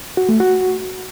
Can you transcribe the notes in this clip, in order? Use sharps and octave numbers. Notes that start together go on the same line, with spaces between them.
F#4
A3
F#4